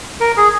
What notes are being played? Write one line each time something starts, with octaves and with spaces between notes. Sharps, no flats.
A#4
G#4